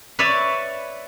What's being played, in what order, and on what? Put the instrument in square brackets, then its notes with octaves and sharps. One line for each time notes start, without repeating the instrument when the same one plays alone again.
[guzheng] B4 C#5 D5 E5